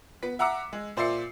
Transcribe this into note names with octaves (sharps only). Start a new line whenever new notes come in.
B3 B6
E5 F#5 A#5 D6 E6 C#7
G#3
A#2 C5 D5 E5 C7 C#7